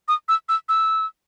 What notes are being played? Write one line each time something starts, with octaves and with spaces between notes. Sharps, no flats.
D#6
E6
E6
E6